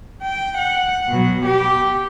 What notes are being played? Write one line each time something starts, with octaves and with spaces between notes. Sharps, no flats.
G5
F#5
B2 F#3
B3 G4